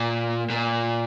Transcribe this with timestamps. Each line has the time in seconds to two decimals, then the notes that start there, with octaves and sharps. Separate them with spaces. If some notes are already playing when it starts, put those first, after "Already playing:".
Already playing: A#2
0.50 A#2